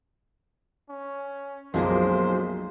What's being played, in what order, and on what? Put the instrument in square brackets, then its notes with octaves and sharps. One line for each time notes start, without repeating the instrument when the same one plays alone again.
[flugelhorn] C#4
[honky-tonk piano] B1 F#2 [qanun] F3 G#3 A#3 [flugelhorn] C5